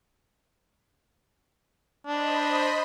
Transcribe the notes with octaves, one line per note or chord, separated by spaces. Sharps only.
D4 C5 D#5 B5